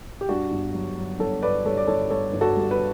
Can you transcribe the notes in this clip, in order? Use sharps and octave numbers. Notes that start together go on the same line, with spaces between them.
G4
G2 D4 F#4
G1
F#3
F#3
G1 A4 C#5
G1 B4 D5
G2 A4 C#5
D5
G1 A4 C#5
G2 A4 C#5
G1
F#4 A4
G2
B4